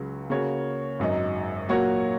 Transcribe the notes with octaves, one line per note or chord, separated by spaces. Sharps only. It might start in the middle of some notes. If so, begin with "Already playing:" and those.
Already playing: C#2 C#3 F#3
C#3 A#3 F#4 C#5
G#1 F#2 F#3 D#4
A#2 F#3 A#3 F#4 C#5